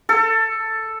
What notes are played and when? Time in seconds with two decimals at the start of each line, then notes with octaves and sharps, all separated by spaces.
0.09 A4